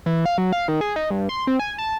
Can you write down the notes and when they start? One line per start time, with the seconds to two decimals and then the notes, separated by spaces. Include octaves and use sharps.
0.06 E3
0.26 F5
0.38 F#3
0.53 F5
0.68 D#3
0.81 G#4
0.96 D#4
1.11 G2
1.29 C6
1.47 C4
1.60 G#5
1.78 A5